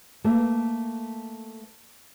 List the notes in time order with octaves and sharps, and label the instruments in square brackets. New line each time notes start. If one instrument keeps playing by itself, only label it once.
[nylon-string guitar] A3 A#3